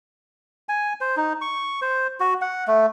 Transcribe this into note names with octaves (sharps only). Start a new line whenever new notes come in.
G#5
C5
D#4
C#6
C5
F#4
F#5
A3